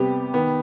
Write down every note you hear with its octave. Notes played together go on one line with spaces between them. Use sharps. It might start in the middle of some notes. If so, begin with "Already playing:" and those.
Already playing: C3 G3 B3 G4
D#3 B3